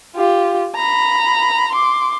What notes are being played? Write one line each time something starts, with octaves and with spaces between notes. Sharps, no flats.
F4 G4
A#5 B5
C6 D6